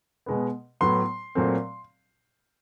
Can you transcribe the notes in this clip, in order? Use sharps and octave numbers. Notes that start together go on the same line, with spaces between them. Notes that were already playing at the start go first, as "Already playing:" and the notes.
B2 G#3 B3
A2 F#3 B3 C6
A#2 F#3 A3 C4